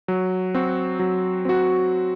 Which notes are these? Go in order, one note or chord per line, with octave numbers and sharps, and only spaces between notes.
F#3
C4 F#4
F#3
C4 F#4